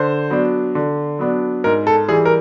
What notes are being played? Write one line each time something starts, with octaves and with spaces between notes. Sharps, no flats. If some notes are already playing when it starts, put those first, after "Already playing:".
Already playing: D3 C5
F#3 B3 D4
D3
F#3 B3 D4
G#2 A#4
A4
E3 G3 G#4
A#4